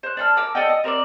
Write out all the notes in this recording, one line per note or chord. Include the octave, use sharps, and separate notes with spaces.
C5 F#6
D4 A4 F6
A#4 D6 E6
A4 D5 D#5 G5
D#5
C4 A#4 C5 D5